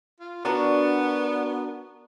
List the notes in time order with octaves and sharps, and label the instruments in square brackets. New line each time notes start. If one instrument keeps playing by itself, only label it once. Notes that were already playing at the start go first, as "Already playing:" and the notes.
[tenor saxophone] F4
[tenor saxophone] B3 [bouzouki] D4 F#4 A#4